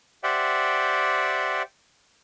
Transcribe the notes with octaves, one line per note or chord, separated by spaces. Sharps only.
G4 C5 D5 E5 F#5 G5